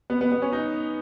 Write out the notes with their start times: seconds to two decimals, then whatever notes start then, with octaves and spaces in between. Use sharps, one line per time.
0.10 B3
0.21 B3
0.32 B3
0.42 C#4
0.53 D#4